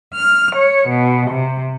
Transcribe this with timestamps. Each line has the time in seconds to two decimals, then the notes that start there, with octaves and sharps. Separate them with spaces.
0.15 F6
0.55 C#5
0.88 B2
1.30 C3